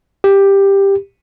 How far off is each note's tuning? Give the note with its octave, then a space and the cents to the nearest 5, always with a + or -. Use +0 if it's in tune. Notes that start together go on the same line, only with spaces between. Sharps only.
G4 +10